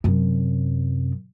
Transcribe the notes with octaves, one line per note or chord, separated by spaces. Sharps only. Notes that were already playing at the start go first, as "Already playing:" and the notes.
F#2 C3